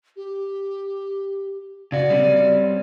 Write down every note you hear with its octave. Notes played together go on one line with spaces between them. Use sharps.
G4
C#3 F#4 D5
G3 C4 C#4